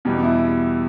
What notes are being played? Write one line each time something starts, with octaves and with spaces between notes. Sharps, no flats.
E2 B2 G3
E4